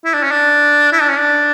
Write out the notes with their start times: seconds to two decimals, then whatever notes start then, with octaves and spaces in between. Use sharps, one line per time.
0.05 E4
0.14 D4
0.23 C#4
0.31 D4
0.93 E4
1.01 D4
1.10 C#4
1.19 D4